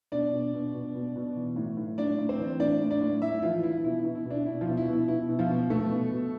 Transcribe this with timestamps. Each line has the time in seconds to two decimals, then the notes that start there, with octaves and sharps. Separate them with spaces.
0.12 B2 D4 D5
0.33 B2
0.53 B2
0.74 B2
0.94 B2
1.16 B2
1.37 E3
1.56 A2
1.77 A2
1.98 A2 D4 D5
2.18 A2
2.29 C4 C5
2.39 E3
2.60 A2 D4 D5
2.81 A2
2.90 D4 D5
3.01 A2
3.22 A2 E4 E5
3.39 E4
3.42 E3 F3 F4
3.63 E3 E4
3.84 B2 E4
4.00 E4
4.05 B2
4.15 E4
4.25 B2
4.30 D4
4.46 B2 E4
4.61 F3 F4
4.67 B2
4.77 E4
4.88 B2
4.93 E4
5.08 B2 E4
5.29 B2
5.39 F3 F4
5.50 B2
5.70 B2 A3 A4
5.91 B2
6.11 B2